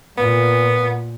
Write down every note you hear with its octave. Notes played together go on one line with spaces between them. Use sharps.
A#2 B3